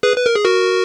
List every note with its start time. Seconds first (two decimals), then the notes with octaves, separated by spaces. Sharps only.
0.03 G#4 B4
0.18 B4
0.26 A#4
0.35 G#4
0.45 F#4 A#4